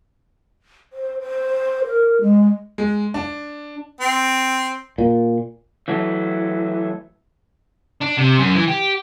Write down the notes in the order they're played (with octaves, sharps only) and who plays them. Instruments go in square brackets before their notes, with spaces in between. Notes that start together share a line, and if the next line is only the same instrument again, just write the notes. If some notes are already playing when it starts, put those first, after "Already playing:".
[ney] C5
C5
A#4
G#3
[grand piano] G#3
D4
[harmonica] C4
[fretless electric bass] A#2
[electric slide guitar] E3 F#3 A3
[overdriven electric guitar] D4
C3
F#2
E3
G4